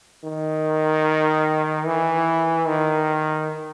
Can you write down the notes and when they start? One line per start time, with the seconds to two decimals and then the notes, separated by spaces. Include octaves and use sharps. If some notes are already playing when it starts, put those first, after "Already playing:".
0.24 D#3
1.86 E3
2.67 D#3